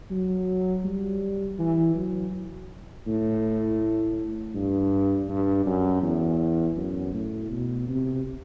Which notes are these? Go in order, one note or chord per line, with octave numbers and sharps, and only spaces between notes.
F#3
G3
E3
F#3
A2
G2
G2
F#2
E2
F#2
A2
B2
C3